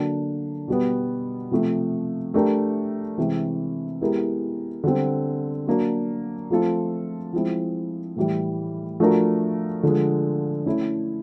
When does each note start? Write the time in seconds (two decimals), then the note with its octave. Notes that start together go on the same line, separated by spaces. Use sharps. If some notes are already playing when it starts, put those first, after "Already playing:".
Already playing: D3 F#3 A#3 D4
0.68 B2 G3 B3
1.51 C3 F3 A3
2.34 A3 D4 G4 A#4
3.18 C3 E3 G#3 C4
4.01 G#3 B3 E4 G4 A#4
4.84 D3 G3 C4
5.67 F#3 A#3 D4
6.50 F3 A3 C4 F4 A4
7.33 F3 G#3 C4 E4
8.16 A2 E3 G3
9.00 F3 A3 D4 F#4 A#4
9.83 D3 F3 G#3
10.66 A3 C#4 E4 A4